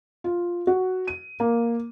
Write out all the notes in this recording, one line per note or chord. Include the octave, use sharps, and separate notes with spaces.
F4
F#4
D#7
A#3